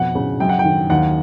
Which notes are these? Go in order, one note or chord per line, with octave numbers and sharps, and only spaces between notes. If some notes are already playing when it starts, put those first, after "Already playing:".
Already playing: F2 B2 F#5
C#3
F#2 G5
F#5
G5
D#3
D#2 F#5